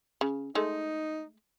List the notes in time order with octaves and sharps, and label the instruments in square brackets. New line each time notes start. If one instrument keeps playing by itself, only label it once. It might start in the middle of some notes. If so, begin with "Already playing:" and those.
[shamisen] C#3
[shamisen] G#3 A3 [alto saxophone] D#4